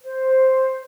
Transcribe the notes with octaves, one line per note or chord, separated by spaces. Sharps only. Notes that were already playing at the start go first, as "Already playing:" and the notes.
C5